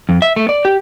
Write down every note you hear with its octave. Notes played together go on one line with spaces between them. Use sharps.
F2
E5
A3
D5
G4